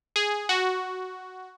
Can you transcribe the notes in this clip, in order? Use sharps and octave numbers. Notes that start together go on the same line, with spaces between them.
G#4
F#4